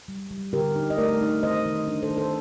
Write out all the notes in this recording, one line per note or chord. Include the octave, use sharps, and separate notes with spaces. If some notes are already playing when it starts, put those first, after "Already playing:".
G3
G3
D3 G4 A#4
D#4
D#5
A3 A#4 D5
D#4
D#3 C5 D#5
D#3
D4
A4 C5
D#3
A4 C5